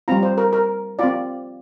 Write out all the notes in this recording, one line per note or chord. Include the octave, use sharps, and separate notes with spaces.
G3 C4 F4 A#5
C5
A#4
A#4
C4 F4 D5